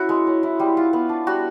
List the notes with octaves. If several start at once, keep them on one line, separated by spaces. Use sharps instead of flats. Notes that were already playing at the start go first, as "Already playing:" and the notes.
Already playing: C#4 E4 F#4
G#3
C#4
E4
G3
F4
B3
D4
G3 F#4